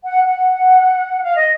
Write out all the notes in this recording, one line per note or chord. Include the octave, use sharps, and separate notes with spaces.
F#5
F#5
F5
D#5